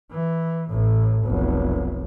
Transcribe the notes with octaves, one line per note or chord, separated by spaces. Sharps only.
E3
A1 A2
F1 B1